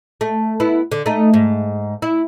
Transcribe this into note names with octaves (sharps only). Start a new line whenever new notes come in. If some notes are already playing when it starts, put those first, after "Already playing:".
A3
B3 E4
D3
A3 D#4
G#2
E4